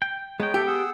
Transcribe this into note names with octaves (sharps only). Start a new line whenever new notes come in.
G5
G#3 B3 C#5 G5 A#5
G4 A4 E5
G#4 F#5 E6